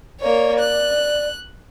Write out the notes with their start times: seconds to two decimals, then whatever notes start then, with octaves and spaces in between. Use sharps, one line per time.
0.21 A#3 C#5 D5
0.60 F#6